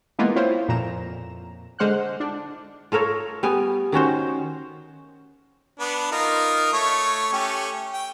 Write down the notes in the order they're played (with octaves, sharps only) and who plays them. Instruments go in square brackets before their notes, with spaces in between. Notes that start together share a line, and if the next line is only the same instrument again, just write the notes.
[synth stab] E3 G#3 A#3 B3 F4
C4 E4 F4 C5 C#5
F2 A#2 A#5 E7
D3 G#3 C5 F#5 F6 F#6
D4
[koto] F4 A4 A#4 C#5
G3 B3 G#5
D#3 C#4 F#4 C5
[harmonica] B3 D4
D#4 F4 A#4
A3 C#5
A3 C#4 G4
G5